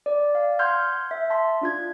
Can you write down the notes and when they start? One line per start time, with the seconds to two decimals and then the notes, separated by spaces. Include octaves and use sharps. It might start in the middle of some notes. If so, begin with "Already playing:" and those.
0.06 D5
0.35 F5
0.59 F#5 C6 F6 G6 G#6
1.11 E5
1.30 A5 C6 B6
1.61 D4 F4 G#6